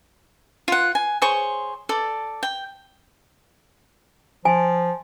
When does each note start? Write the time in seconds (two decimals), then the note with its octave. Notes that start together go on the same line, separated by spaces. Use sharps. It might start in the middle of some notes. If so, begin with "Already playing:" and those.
0.68 F4 F#5
0.95 G#5
1.22 G#4 C5 C#5 C#6
1.89 A4 D5
2.43 G5
4.45 F3 G#5